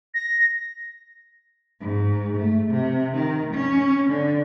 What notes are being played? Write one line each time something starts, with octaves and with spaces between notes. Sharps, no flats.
A#6
G#2
A3
C3
D#3
C#4
D3